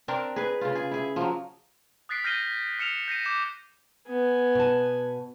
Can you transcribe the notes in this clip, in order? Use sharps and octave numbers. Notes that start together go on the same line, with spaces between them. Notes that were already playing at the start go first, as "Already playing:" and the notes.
C4 D4 A#4
G#4 B4
C#3 F4
G#4
E4 G#4
F3 F#3
D#6 F#6 A6 B6 C7 D7
F6 G6 A#6 C7 D#7 G7
F6 C#7 E7 F7
G6 A#6 C7 D#7
D6 G6 E7
B3 G#5
B2 A5